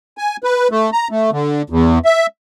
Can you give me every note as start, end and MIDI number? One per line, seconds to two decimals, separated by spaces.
0.18 0.37 80
0.43 0.68 71
0.71 0.90 57
0.93 1.08 82
1.11 1.30 57
1.32 1.62 50
1.70 1.99 40
2.05 2.26 76